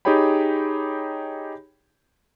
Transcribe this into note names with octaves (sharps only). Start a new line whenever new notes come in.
D#4 G4 G#4 C#5 G5 B5